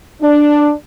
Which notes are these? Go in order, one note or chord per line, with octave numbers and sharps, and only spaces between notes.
D4